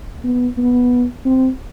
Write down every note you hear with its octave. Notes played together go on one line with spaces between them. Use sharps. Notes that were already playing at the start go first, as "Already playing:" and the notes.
B3
B3
C4